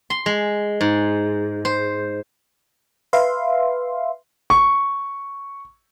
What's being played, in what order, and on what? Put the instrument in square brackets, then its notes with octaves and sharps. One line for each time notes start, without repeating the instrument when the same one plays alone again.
[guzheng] C6
G#3
G#2
C5
[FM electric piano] B4 E5 F5 C6
[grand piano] C#6